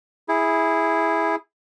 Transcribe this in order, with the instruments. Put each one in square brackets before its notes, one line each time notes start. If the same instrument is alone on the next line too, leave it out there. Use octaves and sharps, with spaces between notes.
[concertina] E4 G#4